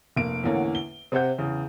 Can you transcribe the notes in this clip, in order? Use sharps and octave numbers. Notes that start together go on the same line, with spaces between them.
F1 A#3 D7
E2 A2 D3 A#3 C#4 F#5
G7
C3 C4 C5 F#5 G6
E2 C#3